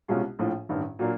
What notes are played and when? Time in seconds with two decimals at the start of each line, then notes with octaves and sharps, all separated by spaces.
0.08 C2 B2 G#3 C#4 F4
0.39 A#1 A2 F3
0.69 A1 G2 D#3
0.99 A#2 F#3 A#3 D4